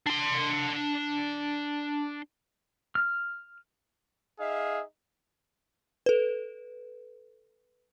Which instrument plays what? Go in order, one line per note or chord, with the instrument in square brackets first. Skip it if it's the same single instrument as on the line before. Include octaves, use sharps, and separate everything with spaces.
[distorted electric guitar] D4 C6
[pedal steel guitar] F6
[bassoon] D#4 [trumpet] G#4 [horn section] E5 F5
[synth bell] A4 B4